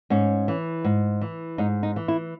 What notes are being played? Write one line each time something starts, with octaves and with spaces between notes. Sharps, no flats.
G#2 C#4
E3
G#2
E3
G#2 D#4
D#4
E3
E4